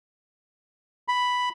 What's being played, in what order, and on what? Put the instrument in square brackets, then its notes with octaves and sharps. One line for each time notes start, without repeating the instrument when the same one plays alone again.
[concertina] B5